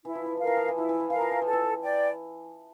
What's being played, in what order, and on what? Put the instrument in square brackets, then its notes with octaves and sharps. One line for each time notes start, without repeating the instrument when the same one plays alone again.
[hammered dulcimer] E3 [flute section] E4
[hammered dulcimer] F3
E3
[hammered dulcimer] F3 [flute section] A#4 F5
[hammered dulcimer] E3
F3
E3
[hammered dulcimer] F3 [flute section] E4
[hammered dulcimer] E3
F3
[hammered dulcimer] E3 [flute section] A#4 F5
[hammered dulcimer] F3
E3
[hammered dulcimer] F3 [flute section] A4
[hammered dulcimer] E3
[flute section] D5 G5